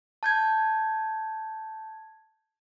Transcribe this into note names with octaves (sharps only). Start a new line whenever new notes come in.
A5 G6 G#6